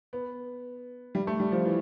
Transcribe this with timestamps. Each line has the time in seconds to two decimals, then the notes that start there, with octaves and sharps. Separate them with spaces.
0.13 B3
1.15 G3
1.27 A3
1.40 G3
1.52 F3
1.65 E3